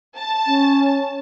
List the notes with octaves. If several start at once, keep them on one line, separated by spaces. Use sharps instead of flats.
A5
C#4